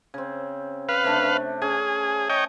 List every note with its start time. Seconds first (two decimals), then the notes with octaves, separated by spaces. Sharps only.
0.14 C#3 C4
0.89 B4 F5
1.04 C3 A3 D4
1.62 C#4 G#4
2.29 C#5 D#5 G5